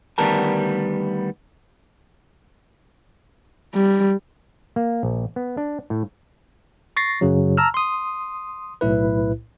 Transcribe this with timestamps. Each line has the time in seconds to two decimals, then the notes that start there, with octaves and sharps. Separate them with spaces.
0.18 D2 D#3 G3 B3 A#4 A5
3.75 G3
4.76 A#3
5.03 A#1
5.36 B3
5.57 D4
5.90 A2
6.97 C#6 A6 A#6 C7
7.21 F#2 C#3 F#3
7.57 A5 A#5 E6 F6
7.74 C6 D#6
8.81 B1 A2 E4 B4